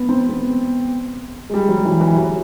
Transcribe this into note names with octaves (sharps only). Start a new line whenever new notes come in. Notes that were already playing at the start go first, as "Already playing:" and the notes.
Already playing: B3
C4
B3
G#3
G3
F#3
E3
E3
F#3